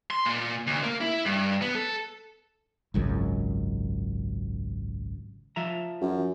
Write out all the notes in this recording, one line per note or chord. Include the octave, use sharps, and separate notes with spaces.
C6
A#2
D2
A#3
E4
G2
B3
A4
G#1 C#2 F#2
F3 E5 A#5
F#2